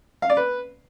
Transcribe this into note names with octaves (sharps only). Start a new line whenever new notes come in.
F5
D5
B4